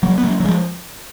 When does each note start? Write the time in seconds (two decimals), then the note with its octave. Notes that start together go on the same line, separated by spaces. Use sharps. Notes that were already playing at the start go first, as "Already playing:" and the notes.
0.03 F#3 A#3
0.18 B3
0.24 F#3 A#3
0.40 F#3
0.45 F3 G#3